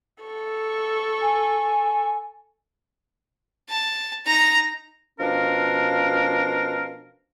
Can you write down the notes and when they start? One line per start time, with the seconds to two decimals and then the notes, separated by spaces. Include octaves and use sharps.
0.24 A4 C#6
1.22 G#5
3.69 A5
4.26 D#4 A#5
5.20 B2 F3 C#4 D4 A#4 F5